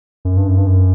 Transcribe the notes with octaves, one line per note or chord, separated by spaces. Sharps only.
F#2
G2
F#2
G2
F#2